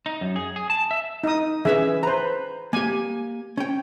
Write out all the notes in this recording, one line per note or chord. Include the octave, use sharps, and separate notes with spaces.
D#4
F#2
G#4
G#4
A5
E5
D#4 D#6
E3 C#4 G#4 B4 E5
B4 C5 A#5
A#3 G4 G#5
C#4 G5